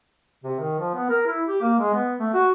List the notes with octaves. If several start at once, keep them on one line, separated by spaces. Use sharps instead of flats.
C3
D#3
F3
B3
A#4
E4
G4
A#3
G#3
B3
A3
F#4